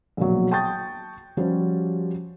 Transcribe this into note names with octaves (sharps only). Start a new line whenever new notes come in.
A#1 B2 F#3
G5 A5 C#6 D#6 G6 A6
F3 G3 C#4 F#4 G4 C5